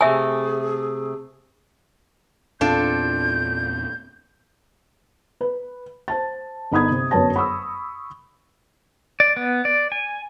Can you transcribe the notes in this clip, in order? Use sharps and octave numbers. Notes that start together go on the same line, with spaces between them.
C3 A3 G#4 E5 G#5
E2 A#2 C4 D4 F4 A4 G6
B4
C5 A5 A6
G1 D#4 B5 D#6 G#6
C3
G1 F#2 B4 C#5 A5 A#6
B5 C#6 D#6 E6
D5
B3
D5
G#5